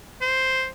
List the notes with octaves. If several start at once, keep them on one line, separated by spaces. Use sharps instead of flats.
C5